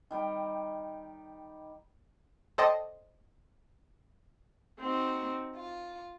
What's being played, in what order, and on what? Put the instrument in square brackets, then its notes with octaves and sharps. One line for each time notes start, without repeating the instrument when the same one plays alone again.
[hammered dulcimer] D#3 G3 G5 A#5
[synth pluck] A4 C5 D5 D#5 G5 A5
[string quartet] C4 D#4 F#4
F4